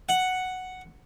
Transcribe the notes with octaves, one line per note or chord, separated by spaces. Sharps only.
F#5